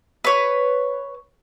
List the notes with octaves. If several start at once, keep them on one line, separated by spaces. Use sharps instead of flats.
B4 C#5